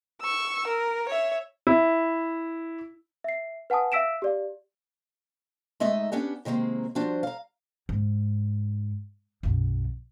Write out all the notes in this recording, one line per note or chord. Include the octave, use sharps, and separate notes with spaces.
C#6 E6
A#4
C#5 E5
E4
E5 C7
B4 F#5 G#5 A5 D#6
E5 F5 E6 B6 D7 E7
G4 D5 F5
G#3 A3 D#4 D#5 E5
B3 C#4 D4 G4 F#5
C3 D#3 G#3 A#3 C4
F3 G3 D4 F#4 C5
F5 A#5
G#2
B1 F#2